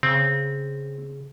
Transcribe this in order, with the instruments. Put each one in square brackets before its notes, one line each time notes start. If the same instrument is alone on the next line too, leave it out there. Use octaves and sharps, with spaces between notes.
[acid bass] C#3 [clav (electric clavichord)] C4